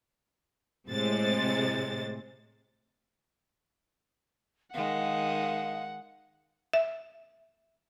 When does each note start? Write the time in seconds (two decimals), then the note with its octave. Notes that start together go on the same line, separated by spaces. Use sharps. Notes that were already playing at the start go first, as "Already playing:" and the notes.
0.89 A2 C3 G#3 C5 A6
4.74 D#3 G#3 F5 F#5
6.74 E5